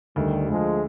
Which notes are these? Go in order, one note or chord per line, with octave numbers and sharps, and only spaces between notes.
D2 D#3 G3
D2 F3 G#3